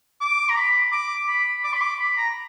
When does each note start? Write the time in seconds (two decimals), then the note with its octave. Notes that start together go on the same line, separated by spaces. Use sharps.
0.21 D6
0.49 A#5
0.56 B5
0.92 D6
1.27 B5
1.64 D6
1.73 B5
1.81 D6
1.99 B5
2.17 A#5